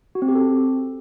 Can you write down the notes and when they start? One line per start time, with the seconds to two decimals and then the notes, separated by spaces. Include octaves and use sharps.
0.15 F#4
0.22 C4
0.29 G4
0.35 A4
0.42 C4